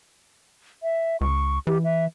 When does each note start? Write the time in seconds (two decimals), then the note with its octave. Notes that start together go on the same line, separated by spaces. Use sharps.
0.83 E5
1.21 C#2 C#6
1.67 E3 G4
1.84 E5